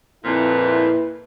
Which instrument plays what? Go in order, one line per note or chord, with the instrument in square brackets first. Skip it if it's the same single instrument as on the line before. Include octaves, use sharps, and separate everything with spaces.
[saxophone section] F2 A#2 [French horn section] E4 B4